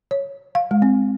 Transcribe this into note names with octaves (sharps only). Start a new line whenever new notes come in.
C#5
F5
G#3
C4